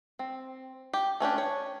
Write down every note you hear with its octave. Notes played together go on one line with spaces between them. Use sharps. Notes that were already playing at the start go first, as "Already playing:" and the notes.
C4
G4
A3 C#4 D4 G4
C#5